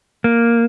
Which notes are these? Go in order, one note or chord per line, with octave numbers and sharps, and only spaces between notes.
A#3